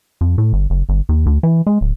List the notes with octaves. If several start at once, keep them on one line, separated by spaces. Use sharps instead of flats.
F2
A2
G1
F#1
G1
D#2
D2
E3
G#3
D1